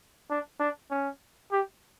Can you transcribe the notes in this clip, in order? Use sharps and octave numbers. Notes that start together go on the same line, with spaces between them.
D4
D4
C#4
G4